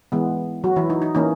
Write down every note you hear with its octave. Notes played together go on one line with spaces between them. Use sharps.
E3 G#3 B3
F#3 F#4
E3 E4
D#4
D#4
E3 A#3 C#4 D#4